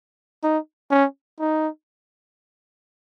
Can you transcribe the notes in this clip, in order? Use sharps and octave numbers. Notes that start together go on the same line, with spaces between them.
D#4
C#4
D#4